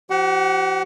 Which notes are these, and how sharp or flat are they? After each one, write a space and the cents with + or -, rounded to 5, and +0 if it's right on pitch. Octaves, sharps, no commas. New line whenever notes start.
F3 -15 G4 -40 F#5 +10